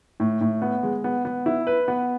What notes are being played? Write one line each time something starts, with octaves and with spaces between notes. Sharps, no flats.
A2
A2
B3
G#3
B3
B3
E4
B4
B3